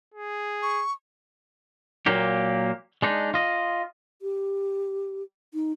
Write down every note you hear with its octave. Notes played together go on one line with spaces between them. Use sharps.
G#4
C#6
A#2 F#3 A#3 G4
G#3 D4 D#4
F4 D#5
G4
D#4